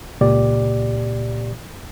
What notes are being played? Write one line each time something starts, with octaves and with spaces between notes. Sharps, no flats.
C#2 A#2 G4 D5